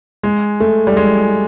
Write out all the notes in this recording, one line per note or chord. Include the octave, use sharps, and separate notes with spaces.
G#3
A3
G3
G#3